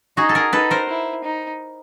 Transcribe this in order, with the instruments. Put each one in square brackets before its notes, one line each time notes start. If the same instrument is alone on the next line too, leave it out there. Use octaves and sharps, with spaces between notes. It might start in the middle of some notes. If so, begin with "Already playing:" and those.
[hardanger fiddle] D#4 [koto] F#4 G#4
[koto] A4
G#4 A#4
[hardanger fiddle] D#4 [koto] A4 B4
[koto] A#4 C5
[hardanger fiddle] E4
D#4